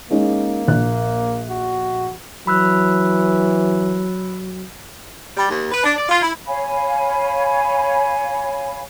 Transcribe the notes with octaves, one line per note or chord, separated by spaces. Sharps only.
G#3 A#3 C#4 D#4
A#1 F#6
F#4
E3 F#3 B5 E6 F#6
G3
D#2
B4
D4
D5
F4
E4
C#5 F5 G#5 B5